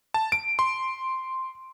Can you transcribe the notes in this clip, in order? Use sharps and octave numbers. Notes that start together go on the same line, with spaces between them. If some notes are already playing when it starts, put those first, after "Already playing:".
A5
D7
C6